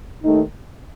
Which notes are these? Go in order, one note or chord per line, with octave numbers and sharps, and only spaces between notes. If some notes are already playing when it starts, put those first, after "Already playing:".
D#2 D#3 A3 D#4